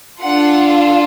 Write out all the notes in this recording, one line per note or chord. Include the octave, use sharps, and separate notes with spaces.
D4 F4 A4 F#5